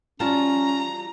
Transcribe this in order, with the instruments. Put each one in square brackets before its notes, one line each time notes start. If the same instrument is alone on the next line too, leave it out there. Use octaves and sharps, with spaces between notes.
[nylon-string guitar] G3 F4 A5 [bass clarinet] C#4 [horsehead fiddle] A#5